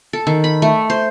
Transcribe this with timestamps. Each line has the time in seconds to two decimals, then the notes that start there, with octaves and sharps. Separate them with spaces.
0.13 A4
0.27 D#3
0.44 B5
0.62 A3
0.90 C5